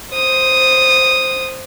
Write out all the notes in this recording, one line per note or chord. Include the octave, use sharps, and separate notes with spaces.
C5 D#6